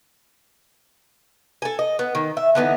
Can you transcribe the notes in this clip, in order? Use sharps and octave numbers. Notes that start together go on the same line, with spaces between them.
A4 G#5
D#5
B3
D#3
E5
D3 E3 B3 D#4